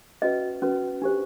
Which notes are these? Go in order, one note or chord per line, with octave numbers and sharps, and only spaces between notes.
C#4 F#4 B4 D#5
C#4 F#4 B4
D4 G4 C5